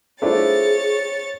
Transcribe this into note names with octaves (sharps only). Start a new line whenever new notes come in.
A3 D4 E4 F4 G#4 C5 C#5 A6